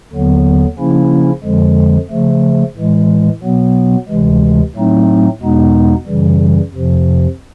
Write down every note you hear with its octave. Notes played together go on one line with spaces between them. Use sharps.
D#2 D3 F#3 B3
C#3 F3 A#3 C#4 E4
F2 D3 F3 G#3
C#3 F3 A3
A2 E3 G#3
B2 F#3 B3
D2 C3 E3 G#3
A2 F#3 A3 C4 D#4
E2 B2 G#3 B3 D#4
F#2 C#3 E3 G3
F2 C3 F3